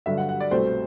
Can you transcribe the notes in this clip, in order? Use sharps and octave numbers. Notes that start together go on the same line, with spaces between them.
G2 D3 F#3 E5
F#5
F#5
D5
C2 B2 A3 C4 C5